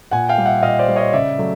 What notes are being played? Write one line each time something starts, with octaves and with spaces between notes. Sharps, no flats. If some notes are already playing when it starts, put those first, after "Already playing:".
A#2 F#5 G#5
F5 G5
G3
E5 F#5
A#2 D#5 F5
C5 D5
G3
C#5 D#5
C#3 D5 E5
F#3 A3